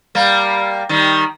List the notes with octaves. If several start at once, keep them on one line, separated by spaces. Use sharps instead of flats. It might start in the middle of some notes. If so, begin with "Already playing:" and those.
G3 A#3
D#3 G3